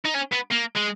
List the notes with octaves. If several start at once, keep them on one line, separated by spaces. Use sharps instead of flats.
D#4
C#4
B3
A#3
G#3